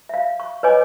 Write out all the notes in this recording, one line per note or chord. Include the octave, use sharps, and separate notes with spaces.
E5 F5
C#6
B4 C#5 D#5 G#5 D6